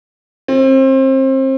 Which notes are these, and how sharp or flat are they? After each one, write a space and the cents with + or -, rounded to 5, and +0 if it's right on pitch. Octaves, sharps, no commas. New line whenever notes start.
C4 +30